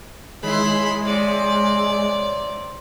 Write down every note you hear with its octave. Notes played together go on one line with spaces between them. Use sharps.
D#3 G#3 E4 C#5 B5 C6
C3 D5